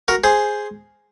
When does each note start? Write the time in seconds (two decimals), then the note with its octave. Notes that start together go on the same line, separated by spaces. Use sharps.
0.08 F#4 A#4
0.24 G#4 C5